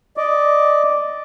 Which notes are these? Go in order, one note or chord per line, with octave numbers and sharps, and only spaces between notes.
D5 D#5 D6